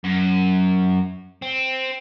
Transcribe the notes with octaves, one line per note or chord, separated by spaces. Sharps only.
F#2
C4